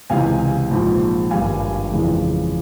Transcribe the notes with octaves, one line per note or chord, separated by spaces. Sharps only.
C#2 C3 E3 F5 G#5
A#1 G#2 F3
G#1 G2 G3 F5 G#5
F2 C#3 E3 G#3